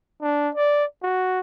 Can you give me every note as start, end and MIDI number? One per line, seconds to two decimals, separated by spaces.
0.22 0.49 62
0.55 0.84 74
1.03 1.40 66